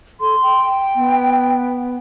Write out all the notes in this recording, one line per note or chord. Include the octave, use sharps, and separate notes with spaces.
A4 C6
G5
B3